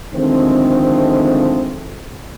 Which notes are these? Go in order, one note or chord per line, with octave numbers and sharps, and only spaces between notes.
D3 D#3 F3 G#3 A3 C4